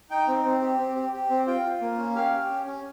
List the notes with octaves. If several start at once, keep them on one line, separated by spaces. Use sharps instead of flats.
D#4 G5
C4
C4
G4
C4
G4
G4
C4
F4 G5
F4
A#3
C#4
G4 F5
G4
C#4
C#4